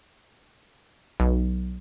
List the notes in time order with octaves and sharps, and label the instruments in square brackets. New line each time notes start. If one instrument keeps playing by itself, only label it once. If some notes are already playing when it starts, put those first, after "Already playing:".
[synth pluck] B1